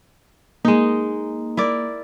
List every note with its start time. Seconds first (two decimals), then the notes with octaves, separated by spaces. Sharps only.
0.65 G#3 A#3 D#4
1.57 E4 A#4 D5